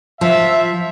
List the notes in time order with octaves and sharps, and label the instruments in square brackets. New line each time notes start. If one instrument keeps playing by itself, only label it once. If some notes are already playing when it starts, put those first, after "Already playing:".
[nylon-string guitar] F3 [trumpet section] E5